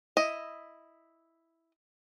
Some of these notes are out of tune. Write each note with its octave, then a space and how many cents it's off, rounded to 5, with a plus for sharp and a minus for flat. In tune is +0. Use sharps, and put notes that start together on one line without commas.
E4 +0 D#5 +0